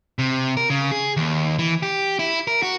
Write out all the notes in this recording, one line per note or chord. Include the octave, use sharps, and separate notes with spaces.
C3
A#4
C#3
G#4
D#2
E3
G4
E4
A#4
F#4